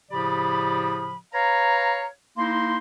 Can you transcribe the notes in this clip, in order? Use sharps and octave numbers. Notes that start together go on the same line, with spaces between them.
A2 C#3 F3 G4 D5 B5
B4 C#5 F5 A#5
A#3 D#4 E4 C6